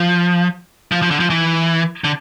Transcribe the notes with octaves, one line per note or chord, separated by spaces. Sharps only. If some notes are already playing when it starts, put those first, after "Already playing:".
Already playing: F3
F3
F3
D3
F3
E3
D3